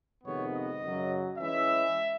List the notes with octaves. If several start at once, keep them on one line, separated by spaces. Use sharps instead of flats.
F2 C3 D#3 G#3 B3 C#5
D#5
F#2 C#3 F#3
E3 G#3 C#4 E4 E5